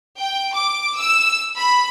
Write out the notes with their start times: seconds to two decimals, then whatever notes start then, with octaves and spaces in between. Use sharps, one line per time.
0.18 G5
0.55 D6
0.98 E6
1.57 B5